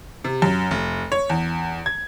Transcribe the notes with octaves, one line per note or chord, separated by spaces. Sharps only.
C3
F#2
F1
C#5
E2
G#6